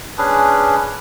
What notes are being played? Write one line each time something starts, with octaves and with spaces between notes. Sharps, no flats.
C#4 D4 G#4 B4